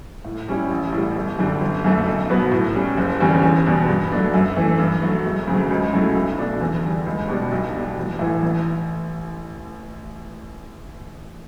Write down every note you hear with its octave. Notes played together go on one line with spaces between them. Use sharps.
A2
G3 C#4 E4
A1
A2 G3
G1
F#2 D3 G3
G1
F#2 D3 A3
B1
B2 F#3 B3
A2
G3 C#4
F#1
E2 D3 G3 C#4
E2
B2 G3 D4
G2
F#3 A3 D4
F#2
E3 A3
G2
F#3 A3
E1
D2 C#3 F#3
C#2
C#3 F#3 A3 E4
B1
B2 A3 D4
E2
D3 G3
C#2
B2 G3 D4
B1
B2 G3 D4
A1
A2 E3
A1